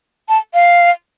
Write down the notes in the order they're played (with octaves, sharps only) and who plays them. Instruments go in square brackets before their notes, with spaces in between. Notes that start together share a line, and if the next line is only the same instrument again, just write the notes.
[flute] A5
F5